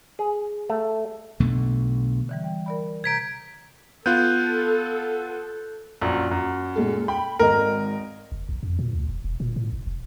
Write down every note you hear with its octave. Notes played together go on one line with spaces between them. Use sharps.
G#4
A3
B1 B2 D3 A3
D3 E3 G3
G5
A#4 D5 B5
C3 A#5 G6 G#6 B6 D7
B3 F4 A4 F#6 G6
A#1 F#2
F#2
A#2 G#3 A4
G5 B5
G#1 G#2 A#4 D#5
F#1
A#1
F2
A#2
D2
E1
E1
A#2
A2
G1
E1